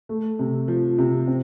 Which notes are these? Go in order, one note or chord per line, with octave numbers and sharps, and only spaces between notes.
A3
C3
F3
C3
C4